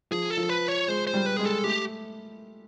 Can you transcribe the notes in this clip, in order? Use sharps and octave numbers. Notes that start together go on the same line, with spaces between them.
F3 G#4
A4
F3
B4
C#5
G#3 C5
C5
G3
B4
G#3 G#4
A4
A3 G4